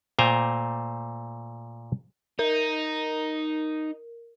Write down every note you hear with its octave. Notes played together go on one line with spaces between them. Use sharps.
A#2 A3 C5 G5 G#5 A#5
D#4 A#4